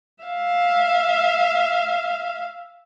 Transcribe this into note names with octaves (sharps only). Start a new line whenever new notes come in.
E5 F5